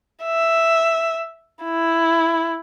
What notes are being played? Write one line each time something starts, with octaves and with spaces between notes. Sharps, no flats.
E5
E4